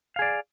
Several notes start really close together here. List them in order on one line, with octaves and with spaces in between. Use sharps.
F5 G#4 D5